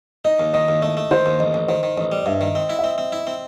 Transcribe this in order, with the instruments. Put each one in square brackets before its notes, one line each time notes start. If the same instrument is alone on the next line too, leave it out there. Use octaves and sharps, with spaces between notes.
[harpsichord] D#4 [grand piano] D#5
[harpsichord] D#2
[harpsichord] D#3 [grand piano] D#5
[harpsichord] D#2
[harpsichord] A3 [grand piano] D#5
[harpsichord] A3
[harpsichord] D#3 [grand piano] C5
[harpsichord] D#2
[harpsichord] A1 [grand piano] D#5
[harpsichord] A1
[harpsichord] D#3 [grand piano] C5
[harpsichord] D#3
[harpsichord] A1 [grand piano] D#5
[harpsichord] G3
[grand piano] D#5
[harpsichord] G2 [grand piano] E5
[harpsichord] D#3
[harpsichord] C4 [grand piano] D#5
[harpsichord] E4
[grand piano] E5
[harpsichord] C4 [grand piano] D#5
[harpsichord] C4
E4
C4